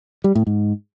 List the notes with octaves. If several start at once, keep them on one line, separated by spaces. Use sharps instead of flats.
G3
A2
G#2